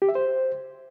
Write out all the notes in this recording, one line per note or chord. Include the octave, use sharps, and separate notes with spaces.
G4
E5
C5